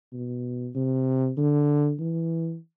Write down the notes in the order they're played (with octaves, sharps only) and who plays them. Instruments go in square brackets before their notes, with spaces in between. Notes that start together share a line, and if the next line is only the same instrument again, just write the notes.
[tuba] B2
C3
D3
E3